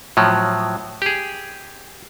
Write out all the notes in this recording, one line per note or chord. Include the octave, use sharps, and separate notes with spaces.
A2 F3 F#3
G4 G#4